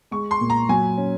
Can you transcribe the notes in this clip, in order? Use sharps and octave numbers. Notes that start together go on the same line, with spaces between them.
G#3 C#6
C6
A#2
A#5
F#3 G#5
C#4